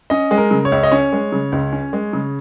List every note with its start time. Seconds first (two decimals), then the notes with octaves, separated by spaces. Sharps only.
0.10 C#4 D#5
0.31 G#3
0.37 A#4
0.51 C#3
0.65 C#5
0.72 C#2
0.83 D#5
0.92 C#4 C#5
1.13 G#3
1.32 C#3
1.52 C#2
1.72 C#4
1.93 G#3
2.13 C#3